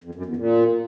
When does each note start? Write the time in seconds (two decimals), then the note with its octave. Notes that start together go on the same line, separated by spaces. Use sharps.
0.04 F2
0.15 F#2
0.26 E2
0.36 A#2